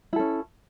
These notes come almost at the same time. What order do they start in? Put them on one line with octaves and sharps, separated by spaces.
E4 A4 C#4